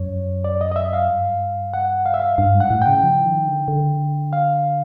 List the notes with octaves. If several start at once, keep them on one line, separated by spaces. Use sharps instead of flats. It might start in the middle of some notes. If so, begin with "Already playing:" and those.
Already playing: F#2 C#5
D5
D#5
D#5
E5
F5
G2
F#5
F5
E5
F5
G2 F5
G#2
F#5
A2
G5
C#3
F3
D#3
D3
D3
F5